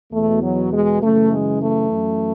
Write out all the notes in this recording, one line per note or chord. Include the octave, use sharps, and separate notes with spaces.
E2 B2 A3
F#3
G#3
F#2 C#3 E3 A3
G#3
A3
F#2 E3